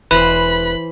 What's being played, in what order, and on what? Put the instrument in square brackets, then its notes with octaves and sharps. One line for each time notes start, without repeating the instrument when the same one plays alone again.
[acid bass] E1 [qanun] E3 C5 [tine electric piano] B4 [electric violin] B5